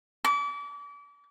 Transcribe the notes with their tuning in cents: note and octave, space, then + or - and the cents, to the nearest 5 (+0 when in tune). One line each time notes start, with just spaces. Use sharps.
D6 -35